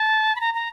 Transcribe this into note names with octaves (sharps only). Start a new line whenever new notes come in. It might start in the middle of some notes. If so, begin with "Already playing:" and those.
Already playing: A5
B5
A#5
A#5